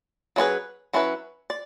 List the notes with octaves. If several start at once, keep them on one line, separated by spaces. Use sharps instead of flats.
F#3 C#4 E4 G#4 B4
F#3 C#4 E4 G#4 B4
D5